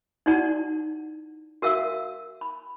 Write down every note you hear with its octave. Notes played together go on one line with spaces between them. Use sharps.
D#4 E4 F#4 D5 F#5 A5
F#4 A#4 E5 F5 E6
B5